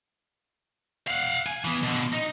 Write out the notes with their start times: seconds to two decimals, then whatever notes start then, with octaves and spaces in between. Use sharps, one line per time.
1.08 F5 F#5
1.47 G#5
1.65 E3 B3
1.84 B2 D3
2.13 D#4